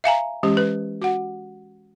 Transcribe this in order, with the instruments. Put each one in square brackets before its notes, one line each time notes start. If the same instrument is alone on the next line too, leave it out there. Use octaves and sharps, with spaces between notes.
[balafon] E5 F5 G#5 A#5
E3 G#3 C#4 G4
B4
F#4 F#5